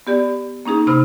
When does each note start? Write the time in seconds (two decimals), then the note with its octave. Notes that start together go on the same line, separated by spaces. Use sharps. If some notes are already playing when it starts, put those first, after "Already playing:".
0.07 B3 G4 D5
0.66 A#3 C#4 D#4 G#4
0.87 C3 D#4 C5 B5 F6